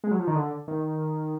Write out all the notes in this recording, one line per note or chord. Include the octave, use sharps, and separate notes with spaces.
G#3
F#3
F3
D#3
D3
D#3